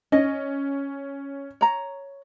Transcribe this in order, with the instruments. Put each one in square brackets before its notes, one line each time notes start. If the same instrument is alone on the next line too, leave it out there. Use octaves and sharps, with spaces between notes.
[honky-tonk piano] C#4 [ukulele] D#5
[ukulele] C#5 A#5